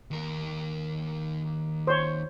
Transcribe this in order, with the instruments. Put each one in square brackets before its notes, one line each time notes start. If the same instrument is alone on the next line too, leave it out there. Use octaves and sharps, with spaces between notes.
[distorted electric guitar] D#2 A#4
[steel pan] C5 C#5